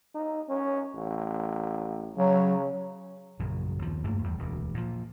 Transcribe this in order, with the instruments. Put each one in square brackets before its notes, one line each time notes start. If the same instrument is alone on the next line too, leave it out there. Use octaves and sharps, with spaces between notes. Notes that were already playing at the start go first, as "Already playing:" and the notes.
[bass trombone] D#4
C#4
A1
[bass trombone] C#3 [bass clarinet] F#3
[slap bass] A#1 F#2 C#3 F#3
D#2 F3
F1 G2 A3 A#3
E2 G3
E1 D2
A#2 F3